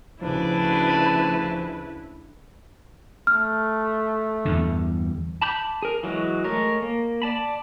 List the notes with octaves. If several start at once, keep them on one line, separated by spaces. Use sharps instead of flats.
D2 C#3 F3 D4 E4 B4
A3 F6
E2 G2 D3
A5 B5 D6 G6
G#4 A#4
E3 F#3 G#3 F#4
G#3 A3 A#4 C#5
A#3
D5 A5 B5